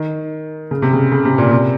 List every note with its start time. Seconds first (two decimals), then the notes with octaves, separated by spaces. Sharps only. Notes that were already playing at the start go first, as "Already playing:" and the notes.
Already playing: D#3
0.71 C#3
0.82 C3
0.93 C#3
1.12 C#3
1.25 C3
1.38 A#2
1.51 C3